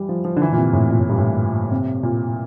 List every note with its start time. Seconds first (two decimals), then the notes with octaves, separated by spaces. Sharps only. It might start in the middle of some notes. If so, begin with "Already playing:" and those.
Already playing: E3 G3
0.09 F3
0.25 F3
0.36 D3
0.42 E3
0.52 A#2
0.58 C3
0.73 A2
0.90 A#2
0.99 A2
1.09 G2
1.18 A2
1.71 C3
2.03 A#2